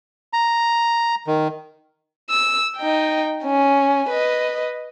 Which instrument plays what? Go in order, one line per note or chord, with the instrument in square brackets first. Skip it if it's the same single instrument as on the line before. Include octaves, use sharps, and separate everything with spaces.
[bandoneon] A#5
D#3
[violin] E6
D#4 G5
C#4
B4 D#5